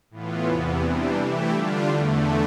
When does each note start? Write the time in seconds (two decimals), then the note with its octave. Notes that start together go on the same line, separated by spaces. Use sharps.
0.10 A2 E3 B3 F4
0.46 E2 C3 E3 B3
0.81 C3 E3 G3 D4
1.16 E3 A3 E4 G4
1.52 D3 G3 D4 F4
1.87 E2 D3 A3